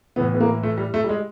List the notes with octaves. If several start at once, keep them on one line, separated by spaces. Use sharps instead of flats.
A2 E3 B3
B3
A#3
A3
G3
A3
G3
G#3